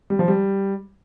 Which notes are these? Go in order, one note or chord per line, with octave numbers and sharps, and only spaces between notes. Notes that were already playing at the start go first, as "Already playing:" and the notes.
G3
F3
G3